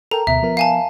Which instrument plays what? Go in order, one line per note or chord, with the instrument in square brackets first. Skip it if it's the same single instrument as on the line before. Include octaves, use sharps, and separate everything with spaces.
[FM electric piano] A4 A#4 G5 [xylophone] A#5
[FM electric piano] D2 B2 [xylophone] E5
[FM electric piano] F3 B3 A#4
[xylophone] F5 G#5 A5